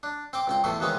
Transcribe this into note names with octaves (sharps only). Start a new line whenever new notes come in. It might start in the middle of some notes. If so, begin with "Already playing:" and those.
D4
C4 G5 D6
C#2 C4 G5
E2 A2 A3 E4 C6
D#2 C3 E3 G#3 B3 C#4